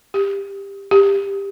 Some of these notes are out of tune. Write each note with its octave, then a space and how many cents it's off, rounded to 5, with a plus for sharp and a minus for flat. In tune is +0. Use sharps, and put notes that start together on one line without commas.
G4 +15
G4 +15